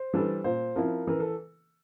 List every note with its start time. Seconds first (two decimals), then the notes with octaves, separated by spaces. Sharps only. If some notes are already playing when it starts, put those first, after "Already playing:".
Already playing: C5
0.14 E3 G3 D4 A4
0.44 A#2 C5
0.76 F3 C4 E4 A#4
1.07 E3 A#4
1.20 A4